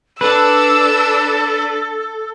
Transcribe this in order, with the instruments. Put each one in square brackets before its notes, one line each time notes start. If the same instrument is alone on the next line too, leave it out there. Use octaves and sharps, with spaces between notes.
[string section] D4 [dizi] A4 [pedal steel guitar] B4 [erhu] E6